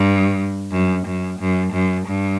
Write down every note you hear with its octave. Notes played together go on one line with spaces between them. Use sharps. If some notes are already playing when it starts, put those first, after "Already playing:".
Already playing: G2
F#2
F#2
F#2
F#2
G2